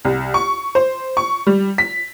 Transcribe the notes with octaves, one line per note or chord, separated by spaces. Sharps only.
C2
C#6
C5
C#6
G3
B6